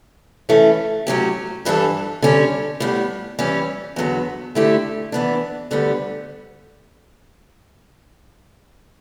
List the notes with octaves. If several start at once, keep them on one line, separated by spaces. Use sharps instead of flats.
E3 A3 C#4
A2 F#3 C#4 G4
G2 E3 G3 D4 A4
D3 G3 C#4 G4
A2 G3 B3
E3 G3 C#4 G4
E2 D3 F#3 B3
D3 A3 E4 G4
E3 B3 D4
D2 D3 G3 B3